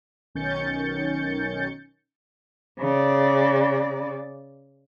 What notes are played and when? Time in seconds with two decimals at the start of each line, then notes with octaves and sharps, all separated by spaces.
0.35 B1 D#3 C#4 G6 A6 C#7
2.79 C#3 D5